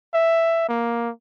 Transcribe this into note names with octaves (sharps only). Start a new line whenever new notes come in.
E5
A#3